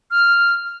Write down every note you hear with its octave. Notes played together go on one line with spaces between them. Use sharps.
F6